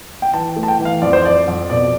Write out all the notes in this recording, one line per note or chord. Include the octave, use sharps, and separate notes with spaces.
G5
E3 A5
A3
A5
G5
E3
F5
F2 D5
C5
F2 D5
F2
B2 D5